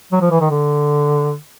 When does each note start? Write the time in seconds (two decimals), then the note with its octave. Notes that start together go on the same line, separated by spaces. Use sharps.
0.12 F#3
0.21 F3
0.31 E3
0.40 D#3
0.50 D3